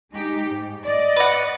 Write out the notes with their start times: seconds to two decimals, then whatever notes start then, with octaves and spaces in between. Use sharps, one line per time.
0.13 G#3 D#4 G4
0.48 G#2
0.85 D5 D#5
1.16 B4 F#5